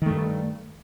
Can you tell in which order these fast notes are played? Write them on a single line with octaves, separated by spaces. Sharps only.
D#3 A3 G2